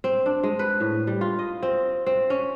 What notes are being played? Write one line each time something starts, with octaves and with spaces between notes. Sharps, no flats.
C4
D4
G#3
B4
A2
G3
F4
D#5
C4
C4
C#4